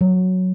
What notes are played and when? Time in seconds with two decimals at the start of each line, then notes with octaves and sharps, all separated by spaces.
0.01 F#3